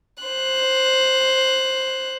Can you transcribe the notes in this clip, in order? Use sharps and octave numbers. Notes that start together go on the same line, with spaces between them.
C5 F#6